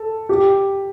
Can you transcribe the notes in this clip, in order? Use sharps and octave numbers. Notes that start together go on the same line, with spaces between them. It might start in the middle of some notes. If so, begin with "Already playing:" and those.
Already playing: A4
G4